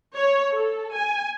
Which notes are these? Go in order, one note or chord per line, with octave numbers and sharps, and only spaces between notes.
C#5
A4
G#5